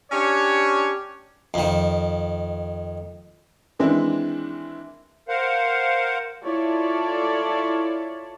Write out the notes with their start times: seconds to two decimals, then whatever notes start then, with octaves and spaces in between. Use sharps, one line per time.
0.11 C#4 D4 G4 C#5
1.54 F2 D#3
3.79 D#3 E3 G#3 C4 D4 E4
5.28 A#4 C5 F5 F#5
6.43 E4 F4 A4 C#5 D5